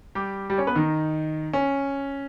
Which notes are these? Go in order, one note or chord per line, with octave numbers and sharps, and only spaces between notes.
G3 G4
G3 G4
C#4 C#5
B3 B4
D#3 D#4
C#4